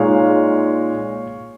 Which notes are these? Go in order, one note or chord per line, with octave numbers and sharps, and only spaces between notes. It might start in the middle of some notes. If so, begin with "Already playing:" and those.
Already playing: A#2 G#3 D#4 C#5 F5